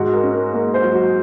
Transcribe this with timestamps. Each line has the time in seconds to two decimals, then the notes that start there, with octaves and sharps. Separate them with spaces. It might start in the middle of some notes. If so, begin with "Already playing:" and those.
Already playing: G#2 F#4
0.13 A#4
0.23 C#4
0.34 A#4
0.53 A#3 A#4
0.74 C5
0.83 F#3
0.94 F#4